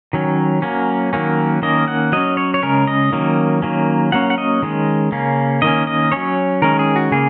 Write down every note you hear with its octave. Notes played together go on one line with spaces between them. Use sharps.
D#3 F#3 C#4
F#3 A#3 C#4
D#3 F#3 A#3 C#4
D#3 A#3 C#4 D#5
F#5
F#3 C#4 D#5
C#5
C#5
C#3 G#3 C#4 A#4
D#5
D#3 F#3 A#3 C#4
D#3 F#3 A#3 C#4
F#3 A#3 C#4 F#5
F#5
D#5
D#3 G#3 C#4
C#3 A#3 C#4
D#3 A#3 C#4 D#5
D#5
F#3 C#4 C#5
D#3 G#3 C#4 A#4
G#4
F#4
C#3 A#3 G#4